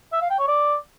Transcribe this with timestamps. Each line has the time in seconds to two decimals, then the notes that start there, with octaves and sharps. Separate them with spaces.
0.13 E5
0.22 F5
0.30 G5
0.39 C#5
0.48 D5